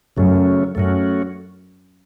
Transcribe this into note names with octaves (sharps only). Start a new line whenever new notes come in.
F#2 C#3 F#3 A3 C#4
F#2 A3 C#4 F#4